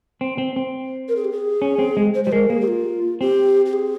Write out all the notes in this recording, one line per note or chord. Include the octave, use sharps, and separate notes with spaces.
C4
C4
C4
A#4
G#4
G4
G#4
C#4
C4
G#3
C5
G3 C5
G#3 A#4
A#3 G#4
G4
F4
C4 G4
G4
G#4